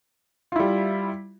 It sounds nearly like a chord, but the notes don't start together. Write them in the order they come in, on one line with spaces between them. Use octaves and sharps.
F4 E4 G3